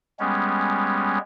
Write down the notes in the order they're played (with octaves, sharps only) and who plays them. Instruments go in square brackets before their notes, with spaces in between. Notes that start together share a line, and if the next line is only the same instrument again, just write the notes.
[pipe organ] G3 G#3 B3 C#4